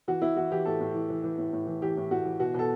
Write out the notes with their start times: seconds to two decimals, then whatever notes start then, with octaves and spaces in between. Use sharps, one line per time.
0.08 E3 F#4
0.22 E3 E4
0.37 E3 F#4
0.51 E3 G4
0.65 A2 A4
0.80 A2
0.94 E3
1.10 E3
1.24 E3
1.38 A2
1.53 A2
1.67 E3
1.82 E3 G4
1.97 A2
2.11 A2 F#4
2.25 E3
2.40 B2 F#4
2.54 B2 A4